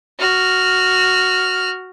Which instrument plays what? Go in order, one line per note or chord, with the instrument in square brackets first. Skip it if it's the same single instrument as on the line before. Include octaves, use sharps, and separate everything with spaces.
[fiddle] F#4 F6